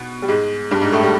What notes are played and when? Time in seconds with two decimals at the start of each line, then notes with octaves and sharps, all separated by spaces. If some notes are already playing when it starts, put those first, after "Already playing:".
Already playing: B2 B3
0.22 G3
0.28 G#2 G#3
0.71 G2 G3
0.82 G#2 G#3
0.92 A2 A3
1.03 G3